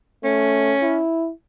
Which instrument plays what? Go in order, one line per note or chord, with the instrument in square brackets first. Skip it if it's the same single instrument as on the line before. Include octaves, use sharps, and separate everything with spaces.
[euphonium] A3 [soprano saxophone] C#4
[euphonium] E4